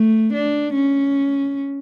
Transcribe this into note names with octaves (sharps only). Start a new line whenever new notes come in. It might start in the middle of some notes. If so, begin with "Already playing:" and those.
Already playing: A3
D4
C#4